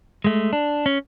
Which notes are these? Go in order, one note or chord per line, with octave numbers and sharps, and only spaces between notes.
G#3 A3
D4
C#4